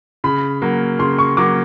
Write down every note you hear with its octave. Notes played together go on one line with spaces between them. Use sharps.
C#3 B5
F#3 A#3
C#3 C6
C#6
F#3 A#3 D6